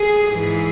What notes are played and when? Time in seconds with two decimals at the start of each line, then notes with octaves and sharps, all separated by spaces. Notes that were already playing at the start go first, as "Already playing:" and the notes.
Already playing: G#4
0.29 G#2 E3 G#4